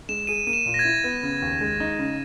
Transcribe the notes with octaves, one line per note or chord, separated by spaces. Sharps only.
G#3 E7
G#4 D#7
A#3 D#7
E7
A#2
A#6
G#6
E4
B3
C#3
D#2
G#3
D#4
C#3